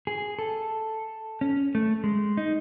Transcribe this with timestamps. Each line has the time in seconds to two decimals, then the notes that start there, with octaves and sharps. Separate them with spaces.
0.07 G#4
0.39 A4
1.41 C#4
1.75 A3
2.04 G#3
2.37 D#4